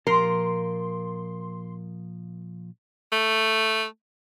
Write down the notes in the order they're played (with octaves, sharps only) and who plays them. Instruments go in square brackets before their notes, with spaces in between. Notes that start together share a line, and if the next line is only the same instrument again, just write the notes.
[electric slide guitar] A#2 F3 [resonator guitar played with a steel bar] A#4 [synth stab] C6
[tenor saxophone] A3